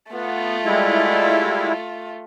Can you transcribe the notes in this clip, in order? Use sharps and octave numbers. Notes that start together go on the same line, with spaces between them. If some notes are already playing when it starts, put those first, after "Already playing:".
A3 B3 F4
G3 G#3 E4